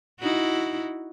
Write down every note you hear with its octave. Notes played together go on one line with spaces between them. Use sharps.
D#4 E4 F#4